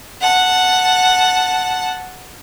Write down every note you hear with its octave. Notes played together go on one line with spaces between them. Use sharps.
F#5 A5